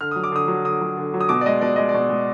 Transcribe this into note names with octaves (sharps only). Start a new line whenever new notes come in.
D3 F6
F#3 D#6
D6
D3 D#6
F#3
D3 D#6
F#3
D3
F#3
D#6
B2 D6
D5
G#3 D#5
B2 D5
G#3 D#5
D5
B2
G#3